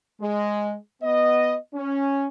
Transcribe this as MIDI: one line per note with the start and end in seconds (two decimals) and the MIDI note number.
0.21 0.74 56
1.02 1.55 59
1.02 1.55 75
1.74 2.27 61